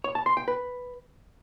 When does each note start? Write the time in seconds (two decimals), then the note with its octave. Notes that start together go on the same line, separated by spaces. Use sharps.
0.04 C#5
0.15 A5
0.26 C6
0.37 G5
0.48 B4